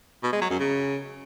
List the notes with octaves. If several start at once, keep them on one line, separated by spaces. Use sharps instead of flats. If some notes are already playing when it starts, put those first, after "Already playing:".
B2
G#3
F#3
F#2
C#3